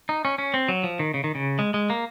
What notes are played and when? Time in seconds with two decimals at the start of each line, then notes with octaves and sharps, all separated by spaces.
0.09 D#4
0.25 C#4
0.38 C#4
0.54 C4
0.68 F#3
0.83 F3
0.99 D#3
1.14 C#3
1.24 D#3
1.35 C#3
1.59 G#3
1.74 G#3
1.90 A#3